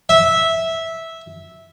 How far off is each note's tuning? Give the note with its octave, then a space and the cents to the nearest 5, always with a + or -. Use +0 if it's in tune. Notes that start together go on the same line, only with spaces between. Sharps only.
E5 -10